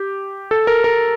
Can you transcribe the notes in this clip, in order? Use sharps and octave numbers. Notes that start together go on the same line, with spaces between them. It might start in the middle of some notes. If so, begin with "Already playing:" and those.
Already playing: G4
A4
A#4
A#4